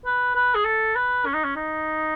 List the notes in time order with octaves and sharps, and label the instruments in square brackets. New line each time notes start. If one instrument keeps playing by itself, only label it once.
[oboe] B4
B4
G#4
A4
B4
C#4
D#4
C#4
D#4